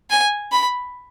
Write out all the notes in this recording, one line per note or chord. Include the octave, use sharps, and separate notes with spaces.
G#5
B5